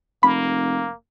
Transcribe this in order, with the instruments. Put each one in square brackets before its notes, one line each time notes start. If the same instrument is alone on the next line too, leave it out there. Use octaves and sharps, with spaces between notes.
[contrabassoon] F1 [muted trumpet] A#3 [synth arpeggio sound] B5